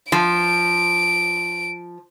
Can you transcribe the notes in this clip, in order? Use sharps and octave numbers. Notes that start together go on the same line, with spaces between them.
F3 D7